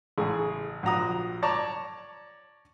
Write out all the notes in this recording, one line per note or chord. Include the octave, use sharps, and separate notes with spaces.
A1 C#3 G#4
A#1 F#4 A#5 D#6
C#5 D5 A5 A#5 C#6